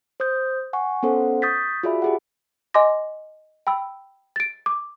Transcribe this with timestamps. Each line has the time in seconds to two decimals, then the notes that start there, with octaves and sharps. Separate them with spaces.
0.20 C5 D#6 G6
0.73 F#5 G#5 C#6
1.03 B3 C#4 A4 C5 F#5
1.42 C#6 D#6 G6 A6 B6
1.83 F4 F#4 G#4 D5 E5 B5
2.02 G4 G#4 F#5
2.74 D#5 G#5 C6 D6 A#6
3.67 G5 B5 E6
4.36 A6 D7
4.66 D6